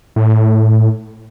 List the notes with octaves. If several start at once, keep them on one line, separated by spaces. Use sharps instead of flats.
A2